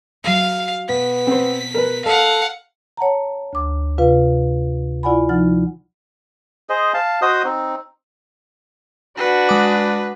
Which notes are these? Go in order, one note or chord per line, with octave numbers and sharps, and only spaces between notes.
F#3 E5 F5
B2 B3 B6
C4 C5
A#4 B4
A4 D#5 F5 F#5
C#5 F#5 A5 A#5
D2 D6
C3 F4 B4 F5
E4 F4 D5 F#5 G#5 B5
F3 D#4 E4 F#5 F6
G#4 C5 D#5
F5 A5
F#4 C5 D#5 D#6
C4 D#4
D4 F#4 B4
G#3 D6